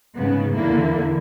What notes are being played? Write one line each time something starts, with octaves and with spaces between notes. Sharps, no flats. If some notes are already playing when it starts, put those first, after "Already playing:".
G#2 C#3 B3
E2 D3 A#3 E4